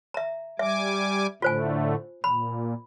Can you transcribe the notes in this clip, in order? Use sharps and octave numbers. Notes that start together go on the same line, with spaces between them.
E5 A#5
G3 E5 G#5 D6
A2 D3 A3 F4 C5 G#5
A#2 B5